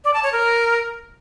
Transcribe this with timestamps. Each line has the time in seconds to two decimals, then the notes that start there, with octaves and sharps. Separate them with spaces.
0.04 D5
0.14 A5
0.23 C#5
0.32 A#4